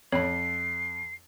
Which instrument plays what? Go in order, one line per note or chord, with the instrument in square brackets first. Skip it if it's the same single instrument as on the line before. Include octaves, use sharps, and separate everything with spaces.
[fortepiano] F2 [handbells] C#5 B5 [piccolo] C7